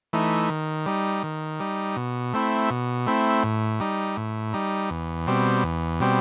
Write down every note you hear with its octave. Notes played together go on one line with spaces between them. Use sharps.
E3 A3 D#4
D#3
G3 D#4
D#3
G3 D#4
B2
A3 C4 E4
B2
A3 C4 E4
A2
G3 D#4
A2
G3 D#4
E2
B2 G3 C4
E2
B2 G3 C4